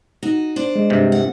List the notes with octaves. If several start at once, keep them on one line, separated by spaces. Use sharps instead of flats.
D#4 F#4
D4 C5
G#3
G2 C3
A2 F#5